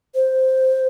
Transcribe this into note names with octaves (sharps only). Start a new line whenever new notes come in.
C5